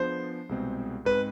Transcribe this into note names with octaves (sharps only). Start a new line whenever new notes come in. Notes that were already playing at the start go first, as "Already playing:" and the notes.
Already playing: F3 B3 D4 G#4 B4 C5
C2 B2 G#3 C4 G#4
G#2 G#3 C4 B4